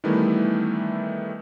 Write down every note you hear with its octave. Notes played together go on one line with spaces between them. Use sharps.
D#3 E3 G3 A3 B3 E4